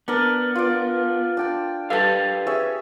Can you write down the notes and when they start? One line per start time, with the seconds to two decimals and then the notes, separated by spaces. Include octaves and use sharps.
0.08 B3 D4 A#4
0.56 F4 D5
1.37 D4 G5 A5
1.90 G4 A4 B4 F5 A5
2.47 G#4 C#5 E5